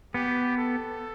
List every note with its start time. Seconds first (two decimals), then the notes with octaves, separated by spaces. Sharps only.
0.14 B3 G4
0.58 A4